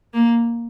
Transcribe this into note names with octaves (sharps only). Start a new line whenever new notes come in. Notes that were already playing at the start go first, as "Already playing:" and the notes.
A#3